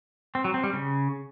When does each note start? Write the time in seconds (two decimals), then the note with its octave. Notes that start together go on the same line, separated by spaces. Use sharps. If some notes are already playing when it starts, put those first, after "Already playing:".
0.35 C4
0.44 F#3
0.54 C4
0.64 G3
0.73 C#3